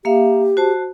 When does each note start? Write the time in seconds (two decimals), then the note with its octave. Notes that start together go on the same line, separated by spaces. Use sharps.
0.05 A#3 G4 E5 F5
0.57 F#4 C5 A5